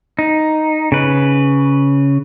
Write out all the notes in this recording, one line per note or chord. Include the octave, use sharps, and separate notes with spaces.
D#4
C#3 B4